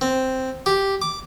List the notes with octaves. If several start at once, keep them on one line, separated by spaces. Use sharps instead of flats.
C4
G4
D6